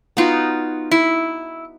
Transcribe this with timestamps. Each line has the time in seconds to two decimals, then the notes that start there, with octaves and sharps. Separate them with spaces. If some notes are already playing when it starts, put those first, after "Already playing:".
0.17 B3 D#4 F4 F#4
0.91 E4